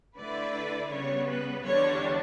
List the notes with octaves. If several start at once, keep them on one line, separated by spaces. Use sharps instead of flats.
D3 A3 E4 B4 D5
C#3 G3 B3 C#5
B4
E2 D3 G3 D4 C#5